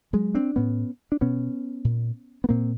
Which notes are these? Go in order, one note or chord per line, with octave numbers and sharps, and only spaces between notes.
F#3 G#3
C4 D4
A2 B3 C#4
D4
B2 B3 C#4
A#2
B3
A#2 A#3 C4